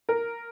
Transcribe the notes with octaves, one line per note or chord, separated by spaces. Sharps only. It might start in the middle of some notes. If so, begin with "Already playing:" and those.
A#4